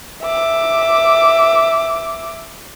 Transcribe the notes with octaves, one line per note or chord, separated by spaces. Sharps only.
E5 D6